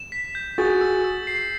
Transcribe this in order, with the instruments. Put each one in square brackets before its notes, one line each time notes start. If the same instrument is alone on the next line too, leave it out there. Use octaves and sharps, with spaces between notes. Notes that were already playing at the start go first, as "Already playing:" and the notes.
Already playing: [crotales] E7
B6
G6
[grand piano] F#4 G#4 [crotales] A6
[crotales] E6
E6
C7